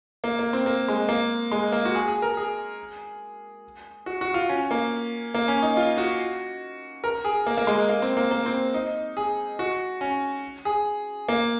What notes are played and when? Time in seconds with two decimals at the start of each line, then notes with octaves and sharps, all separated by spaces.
0.24 A#3
0.39 A#3
0.53 C4
0.66 A#3
0.88 G#3
1.09 A#3
1.51 G#3
1.72 A#3
1.85 F#4
1.95 G#4
2.08 G#4
2.22 A#4
2.37 G#4
4.06 F#4
4.21 F#4
4.34 F4
4.49 C#4
4.71 A#3
5.34 A#3
5.48 C#4
5.62 D#4
5.77 F4
5.98 F#4
7.04 A#4
7.25 G#4
7.47 A#3
7.57 A#3
7.67 G#3
7.89 A#3
8.02 C4
8.17 A#3
8.31 A#3
8.46 C4
8.74 D#4
9.17 G#4
9.59 F#4
10.01 C#4
10.65 G#4
11.28 A#3